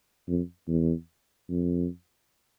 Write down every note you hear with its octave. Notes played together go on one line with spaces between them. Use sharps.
F2
E2
F2